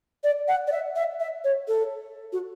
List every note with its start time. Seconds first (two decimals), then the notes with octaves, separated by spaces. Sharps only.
0.23 D5
0.48 F#5
0.67 D5
0.72 E5
0.95 E5
1.20 E5
1.44 C#5
1.68 A4
2.32 F#4